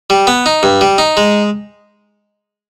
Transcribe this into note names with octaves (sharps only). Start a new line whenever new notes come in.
G3
B3
D#4
G2
G3
D#4
G#3